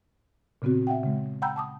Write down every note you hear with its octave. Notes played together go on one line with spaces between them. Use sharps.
A#2 C#3 B3 C4 F#4
E5 F#5 G5
C#3 G#3
F#5 G5 A#5 B5 E6 G6
A5 D6 D#6